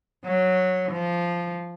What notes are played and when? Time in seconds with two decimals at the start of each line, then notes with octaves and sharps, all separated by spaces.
0.25 F#3
0.91 F3